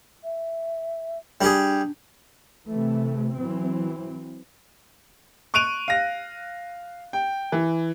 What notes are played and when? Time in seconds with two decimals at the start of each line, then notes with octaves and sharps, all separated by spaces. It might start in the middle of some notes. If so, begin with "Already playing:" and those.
0.24 E5
1.41 G3 D4 G4 G#4
2.70 C3 E3 A3
3.36 E3 F#3 C4
5.54 C#6 F#6 D7 D#7 F7
5.88 F5 A#6
7.13 G5
7.52 E3